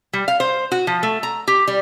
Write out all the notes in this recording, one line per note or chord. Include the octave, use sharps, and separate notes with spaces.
G3
F5
C5
F#4
F3
A3
A#5
G4
G3